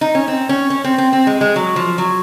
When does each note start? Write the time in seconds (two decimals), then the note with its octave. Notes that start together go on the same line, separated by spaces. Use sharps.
0.01 D#4
0.15 C#4
0.28 C4
0.49 C#4
0.70 C#4
0.84 C4
0.98 C4
1.13 C4
1.27 G#3
1.41 G#3
1.56 F#3
1.76 F3
1.98 F#3